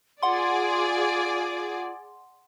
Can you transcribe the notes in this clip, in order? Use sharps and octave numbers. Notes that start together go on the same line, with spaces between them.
F4 G#4 D5 F#5 C6